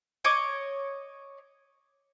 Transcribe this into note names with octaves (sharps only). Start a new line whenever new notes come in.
C#5 D#5 D6